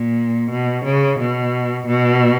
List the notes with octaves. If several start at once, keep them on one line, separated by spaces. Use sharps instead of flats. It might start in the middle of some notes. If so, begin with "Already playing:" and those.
Already playing: A#2
B2
C#3
B2
B2